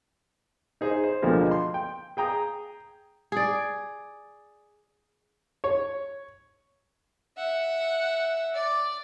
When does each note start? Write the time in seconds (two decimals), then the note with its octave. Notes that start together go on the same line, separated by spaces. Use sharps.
0.81 D#4 G#4 C5 D#5
1.04 C5
1.22 D2 B2 D3 F3 G#3 A#3
1.51 C6
1.74 G5
2.17 G#4 G5 A#5 D#6
3.32 G#4 D5
5.64 C#5
7.37 E5 F#5
8.54 D5